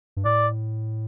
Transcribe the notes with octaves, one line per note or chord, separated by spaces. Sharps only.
G2
A2 D5